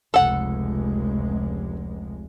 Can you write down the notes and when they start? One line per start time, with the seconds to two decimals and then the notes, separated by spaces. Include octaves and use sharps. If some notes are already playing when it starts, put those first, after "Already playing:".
0.14 F1 C#2 G#3 A4 F#5